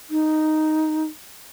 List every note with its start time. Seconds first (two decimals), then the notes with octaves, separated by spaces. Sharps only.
0.11 D#4